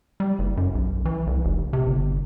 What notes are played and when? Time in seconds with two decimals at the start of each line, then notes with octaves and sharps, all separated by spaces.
0.20 G3
0.39 F#1
0.57 F#2
0.75 B1
1.05 E3
1.27 C2
1.45 F1
1.73 C3
1.87 G1